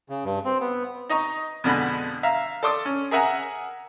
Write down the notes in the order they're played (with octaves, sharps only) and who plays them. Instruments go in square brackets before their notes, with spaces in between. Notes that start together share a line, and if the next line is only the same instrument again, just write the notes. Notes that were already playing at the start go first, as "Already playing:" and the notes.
[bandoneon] C#3
G2
C4
B3
[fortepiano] D#4 D#5 A#5 C#6
F2 B2 D3 G#3 B5
E5 F5 A#5
A4 D5 C6 D6 D#6
C#4
G#4 A#4 E5 F#5 G#5 A#5